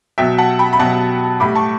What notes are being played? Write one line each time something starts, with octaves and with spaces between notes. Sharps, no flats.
B2 F#3 E5 G5
F#5 A5
G5 B5
B5
B2 F#3 F#5 A5
A2 G3 B5 D6
A5 C#6